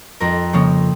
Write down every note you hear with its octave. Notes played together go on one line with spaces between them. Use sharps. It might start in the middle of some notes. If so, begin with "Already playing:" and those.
F2 A#4
C#3 F3 A#3 C#5